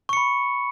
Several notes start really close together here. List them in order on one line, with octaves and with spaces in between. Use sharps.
C#6 C#7 B5